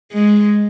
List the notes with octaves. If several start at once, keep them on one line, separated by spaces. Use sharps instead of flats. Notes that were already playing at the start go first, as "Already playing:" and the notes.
G#3